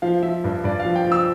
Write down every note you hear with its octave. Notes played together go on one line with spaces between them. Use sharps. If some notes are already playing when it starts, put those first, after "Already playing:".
F3 F5
F3 E5
G2
G2 D5
F5
F3
G5
F3
E6